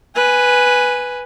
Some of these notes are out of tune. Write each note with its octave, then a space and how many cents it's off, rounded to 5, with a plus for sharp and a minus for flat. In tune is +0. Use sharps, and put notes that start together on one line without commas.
B4 +0 G#5 +0